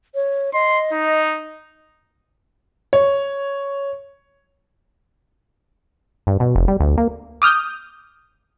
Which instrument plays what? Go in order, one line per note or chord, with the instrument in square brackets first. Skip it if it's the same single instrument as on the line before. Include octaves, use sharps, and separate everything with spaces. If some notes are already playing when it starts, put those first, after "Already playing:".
[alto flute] C#5
[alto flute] D#5 [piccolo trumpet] C6
[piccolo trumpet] D#4
[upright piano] C#5
[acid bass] G2
B2
F1
G3
D2
A#3
[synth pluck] D6 D#6 F6 G6